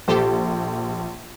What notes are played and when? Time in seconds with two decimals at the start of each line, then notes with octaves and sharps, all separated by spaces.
0.08 A#1 G4 A4 C5